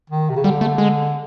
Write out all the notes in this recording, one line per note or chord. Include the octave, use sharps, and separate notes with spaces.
D#3
C3
C#3
D3 G3
A3
G#3